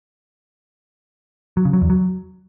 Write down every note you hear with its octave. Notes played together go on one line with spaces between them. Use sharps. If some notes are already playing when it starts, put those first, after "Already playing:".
F#3
C#3
F#3
E2
F#3